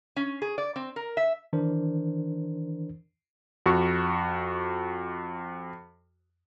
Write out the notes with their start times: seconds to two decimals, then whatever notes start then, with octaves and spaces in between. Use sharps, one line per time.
0.16 C#4
0.42 G#4
0.58 D5
0.76 C4
0.96 A#4
1.17 E5
1.53 D#3 E3 D4 A#4 C5
3.66 F2 F#4 C#6